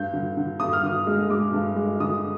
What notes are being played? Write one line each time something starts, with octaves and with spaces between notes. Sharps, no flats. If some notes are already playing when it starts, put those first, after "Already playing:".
Already playing: G2 G6
D3
D3
G2 D#6
F6
D3 D#6
G#3
G#3 D6
G2
G#3
D3 D#6